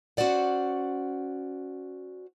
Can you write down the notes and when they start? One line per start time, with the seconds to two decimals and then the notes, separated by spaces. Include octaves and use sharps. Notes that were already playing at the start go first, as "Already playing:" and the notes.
0.17 C#4 F#4 G4 C5 D5 F#5